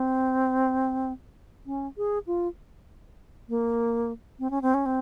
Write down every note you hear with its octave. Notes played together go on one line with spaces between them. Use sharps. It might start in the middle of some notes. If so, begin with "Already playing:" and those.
Already playing: C4
C#4
G#4
F4
A#3
C4
C#4
C4
C#4
C4